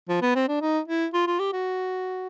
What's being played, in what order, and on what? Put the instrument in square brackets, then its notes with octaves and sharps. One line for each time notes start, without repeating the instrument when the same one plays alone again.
[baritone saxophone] F3
B3
C4
D4
D#4
E4
F4
F4
G4
F#4